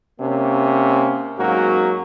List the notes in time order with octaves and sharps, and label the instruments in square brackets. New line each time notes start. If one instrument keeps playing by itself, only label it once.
[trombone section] C3 A#3 C#4
G#2 F#3 A#3 C#4 F#4